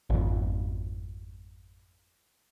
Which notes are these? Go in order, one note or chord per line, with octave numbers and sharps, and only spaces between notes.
G#1 F2